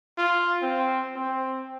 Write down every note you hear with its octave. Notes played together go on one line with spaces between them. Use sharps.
F4
C4
C4